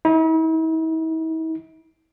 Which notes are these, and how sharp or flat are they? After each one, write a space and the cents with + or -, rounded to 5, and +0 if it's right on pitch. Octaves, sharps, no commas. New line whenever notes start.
E4 -45